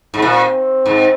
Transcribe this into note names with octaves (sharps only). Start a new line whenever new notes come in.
G#2
A#2 C4
G#2